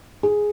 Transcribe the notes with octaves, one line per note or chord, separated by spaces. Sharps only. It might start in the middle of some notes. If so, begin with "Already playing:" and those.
G#4